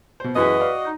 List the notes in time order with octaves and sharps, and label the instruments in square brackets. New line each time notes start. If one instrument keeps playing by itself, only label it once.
[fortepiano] B2 C5
[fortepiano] F#2 E3 G#4 [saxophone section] F#4 D#5 [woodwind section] B4
[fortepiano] D5 F5
[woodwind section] D#4